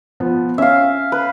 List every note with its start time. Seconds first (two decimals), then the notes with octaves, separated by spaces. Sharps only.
0.20 F3 B3
0.58 C#4 E5 F5
1.12 B4